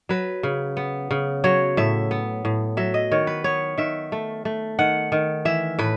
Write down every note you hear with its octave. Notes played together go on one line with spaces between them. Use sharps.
F#3 B4
C#3
B3
C#3
F#3 C#5
A2 E5
B3
A2
F#3 E5
D#5
D#3 C#5
B4
B3 C#5
D#3 E5
A3
A3
D#3 F#5
D#3
E3 E5
A2 B4